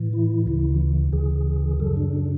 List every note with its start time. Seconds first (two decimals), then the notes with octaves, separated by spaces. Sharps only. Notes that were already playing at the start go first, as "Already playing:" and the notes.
Already playing: A2 E3
0.13 E4
0.46 D2 C#3 E3 E4
1.13 D2 C#3 E3 G#4
1.80 F#2 C#3 F#3 A4
1.97 D4
2.13 D4